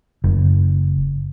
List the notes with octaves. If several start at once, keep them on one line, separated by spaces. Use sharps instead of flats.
F#1